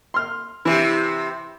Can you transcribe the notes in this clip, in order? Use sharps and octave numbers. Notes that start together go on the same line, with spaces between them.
C6 F6
C3 E3 E4